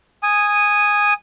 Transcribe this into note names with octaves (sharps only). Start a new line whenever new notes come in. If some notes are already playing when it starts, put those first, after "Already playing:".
G#5 D#6